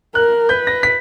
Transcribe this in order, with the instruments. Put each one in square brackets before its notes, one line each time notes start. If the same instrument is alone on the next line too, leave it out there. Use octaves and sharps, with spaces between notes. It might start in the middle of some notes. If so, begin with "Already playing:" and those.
[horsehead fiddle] A#4 [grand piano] F#6
[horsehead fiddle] B4 [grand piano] G6
[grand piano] A#6
B6